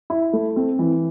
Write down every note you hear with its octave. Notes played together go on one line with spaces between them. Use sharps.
E4
A3
C4
E3